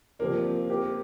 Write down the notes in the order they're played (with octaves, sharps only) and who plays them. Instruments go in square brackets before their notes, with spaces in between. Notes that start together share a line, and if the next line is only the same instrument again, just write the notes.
[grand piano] F3 C4 G4 A#4 D5 [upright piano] A#3
[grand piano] C4 G4 A#4